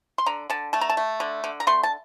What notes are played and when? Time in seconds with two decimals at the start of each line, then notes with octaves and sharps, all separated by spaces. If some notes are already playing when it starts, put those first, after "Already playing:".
0.18 C6
0.26 D3 A#5
0.50 D3 A5
0.73 A3 A5
0.81 A#5
0.89 A5
0.97 A3
1.20 D3
1.44 D3
1.60 A#5
1.67 A3 C6
1.83 A5